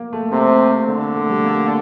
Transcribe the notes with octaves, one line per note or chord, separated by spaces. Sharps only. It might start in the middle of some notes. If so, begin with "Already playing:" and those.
Already playing: A#3
A3
C3 C4
D3 A#3
A3
G3
A#3